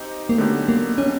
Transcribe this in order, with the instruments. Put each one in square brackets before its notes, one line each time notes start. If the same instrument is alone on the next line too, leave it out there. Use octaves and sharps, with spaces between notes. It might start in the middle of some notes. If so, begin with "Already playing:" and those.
Already playing: [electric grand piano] C4 D#4 G4
[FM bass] A#3
[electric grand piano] D3 F#3 B3 D#4 G4 [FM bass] A3
[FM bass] A#3
C#4